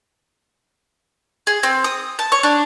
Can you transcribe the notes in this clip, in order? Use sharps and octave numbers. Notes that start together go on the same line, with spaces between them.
G#4
C4
D#6
A5
C#5
D4